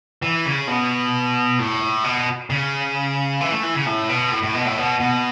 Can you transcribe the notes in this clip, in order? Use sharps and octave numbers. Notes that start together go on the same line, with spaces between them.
E3
C#3
B2
A2
B2
C#3
E3
A3
E3
C#3
A2
B2
A2
A2
B2
A2
B2
B2